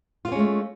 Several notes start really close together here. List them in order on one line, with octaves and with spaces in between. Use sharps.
F4 B3 C#4 G#3 A3